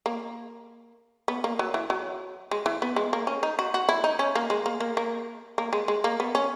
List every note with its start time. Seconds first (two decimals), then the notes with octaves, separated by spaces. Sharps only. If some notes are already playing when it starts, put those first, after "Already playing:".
0.06 A#3
1.28 B3
1.44 A#3
1.59 F#3
1.74 E3
1.90 F#3
2.51 G#3
2.66 E3
2.82 B3
2.96 G#3
3.13 A#3
3.27 C#4
3.43 D#4
3.59 F#4
3.74 F#4
3.89 E4
4.04 D#4
4.19 C#4
4.35 A#3
4.50 G#3
4.66 A#3
4.80 A#3
4.97 A#3
5.58 A#3
5.73 G#3
5.88 G#3
6.04 A#3
6.20 B3
6.35 C#4